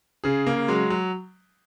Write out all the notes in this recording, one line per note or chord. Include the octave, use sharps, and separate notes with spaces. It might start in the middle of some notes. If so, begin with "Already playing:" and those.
C#3 G#4
C#3 A#3
F#3 G#3
F#3